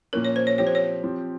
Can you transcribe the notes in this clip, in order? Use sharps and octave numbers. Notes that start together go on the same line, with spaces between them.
A#2 F3 A#3 C#4 A#4
C#5
C5
C#5
F3 C4 G4 C#5
C5
C#5
F3 C4 G4